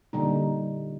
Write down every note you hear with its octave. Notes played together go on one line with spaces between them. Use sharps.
A#2 D3 G3 D#4